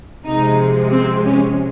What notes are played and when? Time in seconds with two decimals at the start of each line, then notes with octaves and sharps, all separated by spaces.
0.25 C3 F3 G#3 D#4
0.91 C4
1.25 C#4